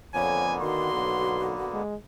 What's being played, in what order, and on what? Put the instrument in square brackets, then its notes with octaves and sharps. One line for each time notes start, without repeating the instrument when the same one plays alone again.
[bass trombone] F2 [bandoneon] D3 A#3 B3 [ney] C#5 [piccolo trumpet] G#5
[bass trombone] D#3 [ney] F#4 [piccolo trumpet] C6
[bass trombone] B1
G#3